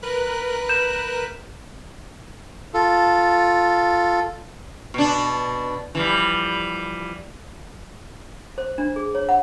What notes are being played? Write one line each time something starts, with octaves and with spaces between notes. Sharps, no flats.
A#4 B4 F#6
G6 E7
F4 A4
B2 D4
E3 F3 G3
C5
D4
G#4
C#5
F#5